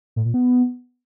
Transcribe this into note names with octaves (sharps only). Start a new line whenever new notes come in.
A2
A#2
B3